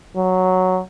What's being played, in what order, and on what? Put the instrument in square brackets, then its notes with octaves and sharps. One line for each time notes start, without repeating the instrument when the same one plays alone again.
[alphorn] F#3